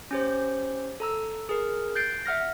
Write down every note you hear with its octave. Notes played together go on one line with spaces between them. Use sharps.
C#4 G4 C5
A4 A#5 E6
G#4 A#4
F#6 G6 A6 C7 D7
E5 F#5 F6 A#6